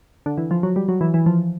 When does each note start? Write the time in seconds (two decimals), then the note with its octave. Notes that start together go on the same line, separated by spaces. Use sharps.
0.26 D3
0.38 E3
0.51 F3
0.63 F#3
0.76 G3
0.88 F#3
1.01 E3
1.14 E3
1.26 F3